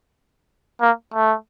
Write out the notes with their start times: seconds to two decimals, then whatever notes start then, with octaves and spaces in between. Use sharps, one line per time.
0.81 A#3
1.14 A3